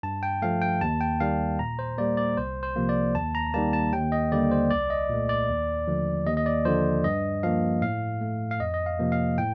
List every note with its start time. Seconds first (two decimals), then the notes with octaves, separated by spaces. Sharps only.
0.03 G2 A5
0.23 G5
0.42 F3 A3 F5
0.62 G5
0.81 D#2 A5
1.01 G5
1.20 D#3 G3 F5
1.59 A#2 A#5
1.79 C5
1.98 G3 A#3 D5
2.17 D5
2.37 C2 C5
2.63 C5
2.76 C3 F3 A#3
2.89 D5
3.15 D#2 A5
3.35 A#5
3.54 D#3 G3 A#3 A5
3.73 A5
3.92 D#2 G5
4.12 D#5
4.32 D3 G3 A#3 D5
4.51 C5
4.70 C2 D5
4.90 D#5
5.09 A#2 A3
5.29 D5
5.49 D#2
5.88 D3 F3 A3
6.27 D#2 D#5
6.37 D#5
6.46 D5
6.65 D3 F3 C5
7.04 G2 D#5
7.43 F3 A#3 F5
7.82 A2 F5
8.21 A3
8.51 F5
8.60 F2 D#5
8.74 D#5
8.86 F5
9.00 C3 F3 A#3
9.12 F5
9.38 A2 G5